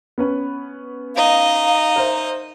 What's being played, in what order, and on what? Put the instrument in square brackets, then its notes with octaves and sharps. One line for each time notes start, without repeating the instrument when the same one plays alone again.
[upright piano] B3 C#4 B4
[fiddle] D#4 D#5 [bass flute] F5
[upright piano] A#4 C5 E5